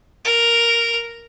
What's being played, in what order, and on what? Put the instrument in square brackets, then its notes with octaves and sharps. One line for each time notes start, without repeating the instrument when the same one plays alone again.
[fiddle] A#4